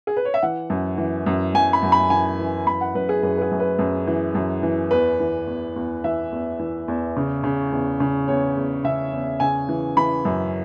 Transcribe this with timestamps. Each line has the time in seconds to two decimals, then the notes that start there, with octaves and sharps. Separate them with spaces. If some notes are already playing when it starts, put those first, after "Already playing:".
0.07 G#4
0.17 B4
0.25 C#5
0.34 E5
0.42 E3 F#5
0.70 F#2
0.98 E3
1.26 F#2
1.54 F#2 G#5
1.73 B5
1.83 F#2
1.92 B5
2.10 E3 G#5
2.39 E3
2.67 F#2 B5
2.81 F#5
2.95 F#2 B4
3.09 G#4
3.23 F#2 B4
3.37 B4
3.42 G#4
3.51 F#2
3.60 B4
3.79 F#2
4.07 E3
4.35 F#2
4.63 E3
4.91 E2 B4
5.20 E3
5.47 E2
5.76 E2
6.04 E3 E5
6.32 E2
6.59 E3
6.88 E2
7.16 C#3
7.44 C#3
7.72 E2
8.00 C#3
8.28 E2 C#5
8.57 E2
8.84 C#3 E5
9.13 E2
9.40 C#3 G#5
9.69 E3
9.97 E3 B5
10.25 F#2